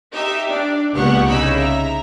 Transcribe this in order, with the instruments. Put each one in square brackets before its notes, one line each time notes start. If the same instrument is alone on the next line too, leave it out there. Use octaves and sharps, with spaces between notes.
[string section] D#4 G4 E5
D4 D5
C#2 A#2 B3 G4 F#5 C#6
C2 C#3 D#4 B5 E6
E5 A#5